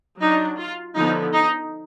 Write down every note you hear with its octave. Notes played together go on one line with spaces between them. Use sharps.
F#3 D4 D#4
F4
D3 F3 B3 D#4
D#4